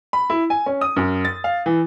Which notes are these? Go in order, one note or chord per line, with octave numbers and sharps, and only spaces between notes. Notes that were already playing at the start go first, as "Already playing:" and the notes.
B5
E4
G#5
C#4
D#6
F#2
A6
F5
E3